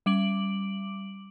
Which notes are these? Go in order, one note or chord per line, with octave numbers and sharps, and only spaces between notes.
G3 D6 D7 F#7